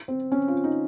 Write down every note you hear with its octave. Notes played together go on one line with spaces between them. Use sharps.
C4
C#4
F4
D#4